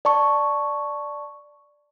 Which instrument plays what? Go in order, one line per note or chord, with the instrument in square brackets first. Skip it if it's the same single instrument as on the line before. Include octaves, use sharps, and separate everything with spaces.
[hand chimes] D5 A5 C#6